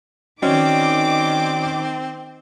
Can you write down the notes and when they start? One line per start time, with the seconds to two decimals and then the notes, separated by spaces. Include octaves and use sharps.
0.42 D#3 C4 C#4 F#4 D5 D#5 D6